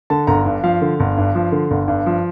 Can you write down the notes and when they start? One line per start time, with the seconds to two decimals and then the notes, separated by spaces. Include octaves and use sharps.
0.10 D3 A5
0.27 G1 A#5
0.46 G2
0.63 F3 F5
0.81 D3
1.00 G1
1.17 G2
1.35 F3
1.52 D3
1.71 G1
1.88 G2
2.06 F3